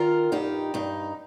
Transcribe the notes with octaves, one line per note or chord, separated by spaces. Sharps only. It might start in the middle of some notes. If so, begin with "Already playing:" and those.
Already playing: D#3 F4 A#4
G2 D#4 G4
G2 D#4